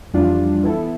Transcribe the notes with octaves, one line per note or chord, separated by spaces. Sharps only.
F2 E3 G3 D4 F4
E3 B3 E4 A4